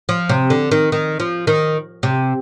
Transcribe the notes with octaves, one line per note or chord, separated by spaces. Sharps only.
F3
C3
D3
D#3
D#3
F3
D#3
C3